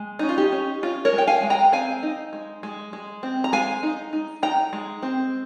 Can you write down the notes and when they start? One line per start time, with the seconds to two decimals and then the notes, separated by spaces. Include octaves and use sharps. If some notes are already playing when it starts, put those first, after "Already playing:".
Already playing: G#3
0.19 C#4 D#4
0.29 F4
0.38 D#4 G4
0.52 C#4
0.83 C#4 F4
1.05 A#4 C#5
1.13 G#3
1.18 G5
1.27 F5 G#5
1.43 G#3
1.50 G5 A#5
1.72 C4 F5 G#5
2.03 D#4
2.33 G#3
2.63 G#3
2.93 G#3
3.23 C4
3.44 A#5
3.52 G#3 F5 G#5
3.83 D#4
4.13 D#4
4.43 D#4 G5 A#5
4.73 G#3
5.03 C4